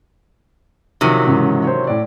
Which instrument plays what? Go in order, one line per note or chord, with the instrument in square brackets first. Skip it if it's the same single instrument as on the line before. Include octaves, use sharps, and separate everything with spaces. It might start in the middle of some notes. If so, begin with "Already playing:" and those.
[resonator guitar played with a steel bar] C3 D#3 F#3 [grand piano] F3 D#7
[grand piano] G#2 C#3 E3
C5 C#5
A2 D5